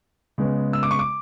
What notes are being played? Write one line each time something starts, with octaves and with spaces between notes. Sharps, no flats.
C#3 G#3 B3
E6
D6
C#6
D6